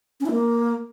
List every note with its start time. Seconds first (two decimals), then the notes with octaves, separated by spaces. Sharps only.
0.20 C#4
0.26 E4
0.31 A#3